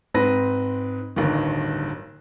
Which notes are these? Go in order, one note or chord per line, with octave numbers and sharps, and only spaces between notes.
G#2 C4 B4 A#6
D1 G1 G2 D#3